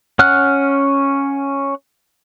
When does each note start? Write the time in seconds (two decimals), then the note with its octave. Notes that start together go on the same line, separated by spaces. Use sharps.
0.19 C#4 F#5 F6 F#6